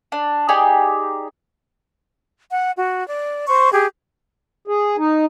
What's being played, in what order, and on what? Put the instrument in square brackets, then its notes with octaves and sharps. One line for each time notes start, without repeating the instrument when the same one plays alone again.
[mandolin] D4
D#4 G4 G#4 D5
[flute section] F#5
F#4
D5
C5 C#6
G4 G#4
[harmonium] G#4
D#4